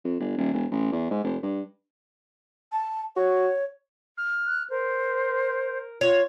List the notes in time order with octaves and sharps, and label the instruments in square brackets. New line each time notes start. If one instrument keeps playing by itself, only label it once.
[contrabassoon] F2
G1
D#1
E1
A1
E2
G#2
F1
G2
[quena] A5
[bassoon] F#4 [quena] C#5
[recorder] F6
[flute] F#6
[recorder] A#4 [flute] C5
[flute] F4 [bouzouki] C#5